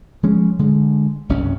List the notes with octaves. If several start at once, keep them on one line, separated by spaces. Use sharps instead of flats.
F3 G#3 C#4
D3 G#3
F#1 C2 G2 C#4